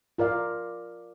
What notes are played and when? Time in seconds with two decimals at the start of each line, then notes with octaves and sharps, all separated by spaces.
0.18 F4 A#4 D5 F5